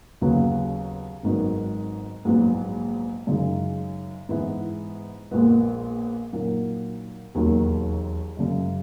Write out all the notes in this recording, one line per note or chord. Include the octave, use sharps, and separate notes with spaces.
D#2 C#3 F#3 B3
G#1 G#2 D#3 F#3 B3
A#1 G#2 F#3 B3
F#2 C#3 G#3 D#4
G#2 E3 G#3 B3 E4
A#1 A#2 G#3 B3
A#2 F#3 A#3 D#4 F#4
E1 D#2 D#3 F#3
F#2 C#3 G#3